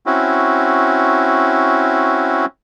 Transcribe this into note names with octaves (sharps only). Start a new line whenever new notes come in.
C4 C#4 E4 F#4